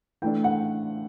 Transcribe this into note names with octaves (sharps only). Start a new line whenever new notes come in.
E3 A3 D4 G5
F#5